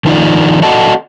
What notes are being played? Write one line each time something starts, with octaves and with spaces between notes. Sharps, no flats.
D#3 F3 D#4 F4 D5
F#4 A4 D5 D#5 F#5 A5